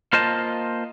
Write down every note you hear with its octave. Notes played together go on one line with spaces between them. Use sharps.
A#3 F4 C5 D#5 A5